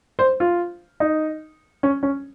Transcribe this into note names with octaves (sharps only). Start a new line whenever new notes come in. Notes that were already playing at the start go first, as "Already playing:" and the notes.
C5
F4
D#4
C#4
C#4